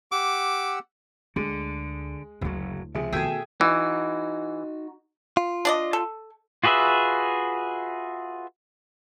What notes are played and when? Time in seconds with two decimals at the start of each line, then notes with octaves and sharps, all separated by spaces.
0.12 G4 F#5 D6 E6
1.36 D2 D3 G#3
2.41 F#1 D2 F#3 E4
2.95 C#2 C3 F3 G#4 E5
3.13 B2 D#3 A3 G#4 E5 G5 G#6
3.61 E3 D#4 F#4
5.37 F4
5.65 D4 D5 D#5
5.93 A4
6.64 F4 F#4 G#4 B4 E5